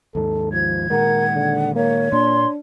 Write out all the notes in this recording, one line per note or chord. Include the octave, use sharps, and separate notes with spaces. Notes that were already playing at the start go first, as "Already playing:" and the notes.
D#2 G#2 A4
F3 G#6
A#2 D#3 G#3 A#4 F#5
D3
A#3 C#5
A#2 A#3 D4 C6